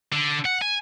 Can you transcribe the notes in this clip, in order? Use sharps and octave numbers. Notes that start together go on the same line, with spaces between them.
D3
F#5
G#5